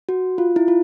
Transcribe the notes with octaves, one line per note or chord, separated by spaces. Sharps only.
F#4
F4
E4
F4